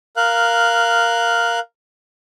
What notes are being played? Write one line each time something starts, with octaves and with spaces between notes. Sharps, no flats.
A#4 F5 F#6